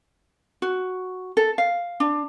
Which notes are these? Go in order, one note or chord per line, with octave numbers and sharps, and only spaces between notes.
F#4
A4
F5
D4